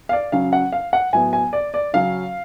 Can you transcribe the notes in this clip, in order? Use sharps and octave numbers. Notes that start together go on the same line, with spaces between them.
F5
D5
C#3 F#3 C#4 F5
F#5
F5
F#5
A2 F#3 B3 G#5
G#5
D5
D5
C#3 F#3 C#4 F5